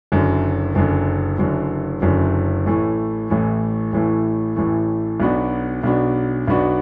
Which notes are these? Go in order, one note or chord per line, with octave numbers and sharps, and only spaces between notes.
F#1 F#2 D3
F#1 F#2 D3
F#1 F#2 D3
F#1 F#2 D3
A1 A2 E3 A3
A1 A2 E3 A3
A1 A2 E3 A3
A1 A2 E3 A3
B1 B2 B3 D4 F#4
B1 B2 B3 D4 F#4
B1 B2 B3 D4 F#4